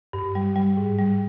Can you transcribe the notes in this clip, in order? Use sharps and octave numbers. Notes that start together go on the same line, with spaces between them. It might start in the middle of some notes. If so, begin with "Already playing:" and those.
G2
G3
G3
G#2
G3